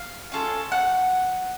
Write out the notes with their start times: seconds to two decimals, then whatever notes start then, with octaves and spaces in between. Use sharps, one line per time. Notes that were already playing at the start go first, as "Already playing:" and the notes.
Already playing: F5
0.32 C#4 F4 A4
0.72 F#5